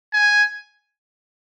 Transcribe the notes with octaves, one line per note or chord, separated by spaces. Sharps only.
G#5